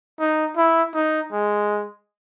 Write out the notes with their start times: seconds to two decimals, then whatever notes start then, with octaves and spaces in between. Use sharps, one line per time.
0.20 D#4
0.57 E4
0.94 D#4
1.32 G#3